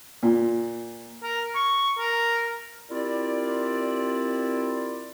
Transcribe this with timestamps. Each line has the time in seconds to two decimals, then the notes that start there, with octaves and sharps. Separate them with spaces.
0.23 A#2
1.23 A#4
1.55 C#6
1.99 A#4
2.90 C4 E4 F4 G4 A#4 D5